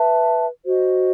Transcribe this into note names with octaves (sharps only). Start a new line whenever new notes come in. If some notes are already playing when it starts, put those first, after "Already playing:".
Already playing: B4 E5 A5
F#4 C5 D#5